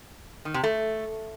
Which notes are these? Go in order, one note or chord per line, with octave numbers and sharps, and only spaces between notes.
D#3
C3
A3